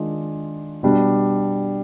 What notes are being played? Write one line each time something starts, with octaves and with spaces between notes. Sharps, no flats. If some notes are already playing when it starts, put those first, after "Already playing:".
Already playing: D#3 G#3 D4 F4
B2 G3 D4